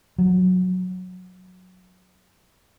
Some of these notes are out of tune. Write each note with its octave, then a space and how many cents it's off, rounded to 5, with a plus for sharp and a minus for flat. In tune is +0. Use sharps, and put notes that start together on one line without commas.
F#3 -10